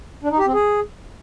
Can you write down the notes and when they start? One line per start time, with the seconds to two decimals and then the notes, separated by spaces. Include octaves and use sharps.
0.23 D4
0.31 D#4
0.38 G4
0.46 C4
0.54 G#4